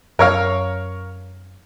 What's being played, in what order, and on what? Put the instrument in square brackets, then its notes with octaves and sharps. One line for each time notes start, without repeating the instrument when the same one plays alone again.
[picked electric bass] F#2 [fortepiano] A#4 C#5 F5